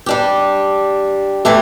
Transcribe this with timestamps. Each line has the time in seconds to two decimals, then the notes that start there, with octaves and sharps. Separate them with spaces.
0.06 G3 D4 G4
1.45 E3 A3 G4